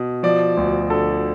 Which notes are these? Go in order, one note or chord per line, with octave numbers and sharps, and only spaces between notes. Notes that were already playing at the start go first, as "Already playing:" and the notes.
Already playing: B2
F3 D5
D2
D3 A4